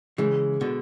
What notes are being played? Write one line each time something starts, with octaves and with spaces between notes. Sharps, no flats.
C#3 E3 G#3
B2 D3